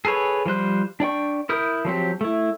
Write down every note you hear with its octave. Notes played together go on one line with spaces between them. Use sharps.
G#4 A4 B4 C#5
F3 G3 C5 F#6
D4 D5 G5 C#6
E4 A#4 D#6 G6
F3 F#3 C4 G4
A3 E4